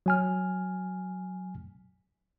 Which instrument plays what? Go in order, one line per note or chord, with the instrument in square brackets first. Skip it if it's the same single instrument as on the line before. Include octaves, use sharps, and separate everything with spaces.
[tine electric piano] F#3 G#5 F6